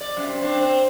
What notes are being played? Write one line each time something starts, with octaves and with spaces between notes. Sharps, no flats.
D5
F#2 C3
G2 C4 D4
C4